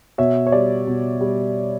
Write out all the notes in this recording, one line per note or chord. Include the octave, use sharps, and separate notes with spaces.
B2 C#5 E5
C#5
G3 D5
B2
G3